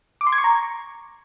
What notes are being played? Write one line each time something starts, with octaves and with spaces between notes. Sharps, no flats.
D6
C6
G#6
C#6
A#5